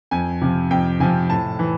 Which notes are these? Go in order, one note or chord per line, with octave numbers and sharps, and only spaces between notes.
F2 G#5
C3 F3
F2 G5
C3 F3 G#5
A2 A5
E3